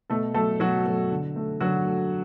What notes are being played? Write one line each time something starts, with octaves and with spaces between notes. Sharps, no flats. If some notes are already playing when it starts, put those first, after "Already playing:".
B2 A3 A4
F#3 A3 A4
B2 F#3 F#4
F#3 A3
D3
A3
D3 F#3 F#4
A3